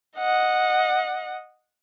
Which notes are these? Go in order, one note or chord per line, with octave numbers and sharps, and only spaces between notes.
D#5 F#5